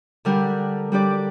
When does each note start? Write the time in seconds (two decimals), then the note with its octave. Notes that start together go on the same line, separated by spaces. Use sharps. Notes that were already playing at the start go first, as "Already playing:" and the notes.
0.25 D3 G3 D4 G4 A#4
0.92 G3 D4 G4 D5